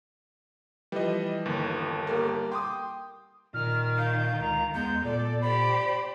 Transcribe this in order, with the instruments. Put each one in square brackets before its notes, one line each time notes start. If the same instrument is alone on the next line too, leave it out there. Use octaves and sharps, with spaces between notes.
[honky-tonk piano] E3 F3 [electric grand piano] G3 D#5
[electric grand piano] G1 D#2
[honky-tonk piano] G3 A#3
[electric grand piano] G5 [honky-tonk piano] C6 D6 D#6
[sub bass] A#2 [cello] D#3 [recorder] F6
[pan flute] F5 [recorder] G6
[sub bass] C#2 [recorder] A#5
[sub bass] E2 [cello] G#3 [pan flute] B3 [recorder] G6
[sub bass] A#2 [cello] A4 [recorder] D5
[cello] G4 C5 [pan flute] D5 [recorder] B5